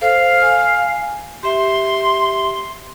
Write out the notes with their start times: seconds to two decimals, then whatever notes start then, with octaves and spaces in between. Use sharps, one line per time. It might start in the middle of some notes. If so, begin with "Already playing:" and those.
0.01 A4 C5 F5
0.42 G#5
1.43 G4 E5 C6